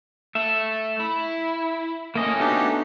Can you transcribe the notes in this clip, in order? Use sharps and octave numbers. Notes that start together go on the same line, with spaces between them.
A3 E5
E4
A3 A#3 C#4 D#5
B3 D4 D#4 F#4 G4 A4